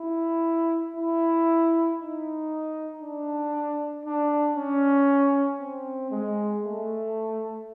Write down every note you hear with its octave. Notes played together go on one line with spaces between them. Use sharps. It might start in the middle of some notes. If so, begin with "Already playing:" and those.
Already playing: E4
E4
D#4
D4
D4
C#4
C4
G#3
A3